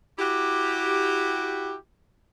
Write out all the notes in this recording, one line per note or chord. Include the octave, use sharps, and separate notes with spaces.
E4 F#4 G4